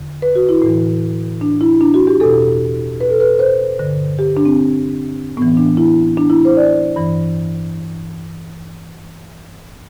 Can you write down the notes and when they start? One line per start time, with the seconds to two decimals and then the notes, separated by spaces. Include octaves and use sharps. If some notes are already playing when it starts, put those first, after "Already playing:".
Already playing: E2 D3
0.22 B4
0.35 F#4
0.49 E4
0.62 A2 E3
1.41 D4
1.61 E4
1.81 D4
1.94 F#4
2.07 G4
2.20 E2 B2 A4
3.00 B4
3.10 A4
3.20 B4
3.39 C5
3.79 G2 D3
4.19 G4
4.37 D4
4.45 C4
5.37 A2 E3 B3
5.57 D4
5.77 E4
6.17 D4
6.30 E4
6.45 C5
6.57 D5
6.96 G2 E3